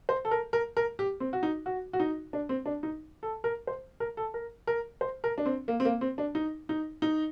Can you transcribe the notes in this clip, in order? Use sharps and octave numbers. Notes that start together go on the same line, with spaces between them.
C5
A4
A#4
A#4
A#4
G4
C4
F#4
D#4
F#4
F#4
D#4
D4
C4
D4
D#4
A4
A#4
C5
A#4
A4
A#4
A#4
C5
A#4
D4
C4
A#3
C4
A#3
C4
D4
D#4
D#4
D#4